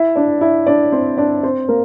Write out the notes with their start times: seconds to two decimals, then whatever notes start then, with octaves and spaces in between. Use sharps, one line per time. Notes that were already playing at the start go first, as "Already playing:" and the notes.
Already playing: E4 E5
0.16 D4 D5
0.41 E4 E5
0.67 D4 D5
0.92 C4 C5
1.17 D4 D5
1.43 C4 C5
1.69 A#3 A#4